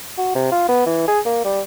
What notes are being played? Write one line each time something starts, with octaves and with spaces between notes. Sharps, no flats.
F#4
C3
F4
B3
E3
G#4
A#3
G3